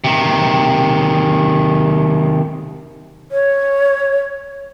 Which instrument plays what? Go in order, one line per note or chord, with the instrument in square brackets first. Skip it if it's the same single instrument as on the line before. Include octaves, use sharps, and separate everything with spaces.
[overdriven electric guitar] C3 D#3
[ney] C#5